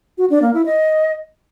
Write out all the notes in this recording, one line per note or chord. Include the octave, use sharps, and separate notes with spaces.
F#4
D4
A#3
E4
D#5